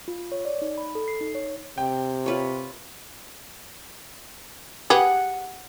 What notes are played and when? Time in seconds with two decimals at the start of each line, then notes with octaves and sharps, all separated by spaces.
0.08 F4
0.32 C#5
0.45 D5
0.62 D#4
0.78 B5
0.95 A4
1.08 C7
1.21 D#4
1.35 C#5
1.78 C3 G5
2.26 F4 B4 C#5
4.90 G4 G#4 B4 F#5